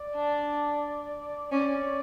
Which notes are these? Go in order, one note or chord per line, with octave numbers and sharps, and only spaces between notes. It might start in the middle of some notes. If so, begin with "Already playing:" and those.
Already playing: D5
D4
C#4 D5